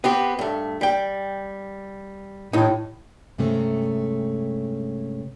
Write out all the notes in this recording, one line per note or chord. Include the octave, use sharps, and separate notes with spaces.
B3 C4 G4
G2 A3
G3 G5
D#2 A2 D#4
G2 C3 G#3 A3 C#4